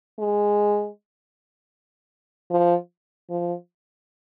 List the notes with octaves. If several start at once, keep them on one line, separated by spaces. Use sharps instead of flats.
G#3
F3
F3